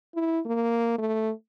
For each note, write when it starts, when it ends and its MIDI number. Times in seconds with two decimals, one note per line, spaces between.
0.15 0.40 64
0.46 0.95 58
0.98 1.31 57